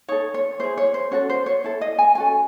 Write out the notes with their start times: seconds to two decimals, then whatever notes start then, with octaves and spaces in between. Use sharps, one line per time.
0.08 D#4 A4 C#5
0.34 C#5
0.60 E4 G#4 C5
0.77 C#5
0.94 C5
1.11 C#4 F#4 A4 C#5
1.30 C5
1.46 C#5
1.64 E4 A4
1.81 D#5
1.99 G#5
2.15 C#4 F#4 A4 G#5